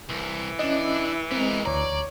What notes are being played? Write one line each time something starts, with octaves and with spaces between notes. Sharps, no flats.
C2 E3
C#4 D4 E4 D#5
G#3 B3 C4 A#4
D2 C#5 D5 A#5